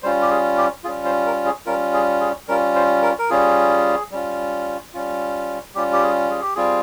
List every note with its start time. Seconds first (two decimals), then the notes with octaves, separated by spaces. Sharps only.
0.03 G3 C#4 F4 C5
0.22 G4
0.30 G#4
0.57 G4
0.84 G3 C#4 F4 G#4
1.05 C5
1.26 A#4
1.46 G#4
1.66 G3 C#4 F4 A#4
1.93 G#4
2.21 G#4
2.48 G3 C#4 F4 A#4
2.75 C5
3.02 A#4
3.19 A#4
3.30 G3 C#4 F4 G#4
4.12 G3 C#4 F4
4.94 G3 C#4 F4
5.75 G3 C#4 F4 G4
5.93 G4
6.03 G#4
6.30 G#4
6.42 G4
6.55 G3 C4 F4 G#4